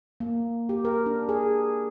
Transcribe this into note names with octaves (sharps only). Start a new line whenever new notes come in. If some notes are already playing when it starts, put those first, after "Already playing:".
A#3
G4
A#4
D4
G#4